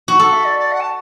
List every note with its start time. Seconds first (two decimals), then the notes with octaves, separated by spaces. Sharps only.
0.08 F#4
0.19 A4 F#5
0.32 E5
0.45 D5
0.59 D5
0.72 F#5
0.80 A5